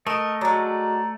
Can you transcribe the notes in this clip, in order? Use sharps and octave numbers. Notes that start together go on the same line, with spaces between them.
A3 A#4 D#5
F#3 G#3 D5 A#5